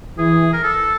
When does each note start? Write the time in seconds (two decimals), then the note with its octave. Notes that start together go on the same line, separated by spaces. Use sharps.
0.18 E3 G#4
0.53 A#4
0.63 A4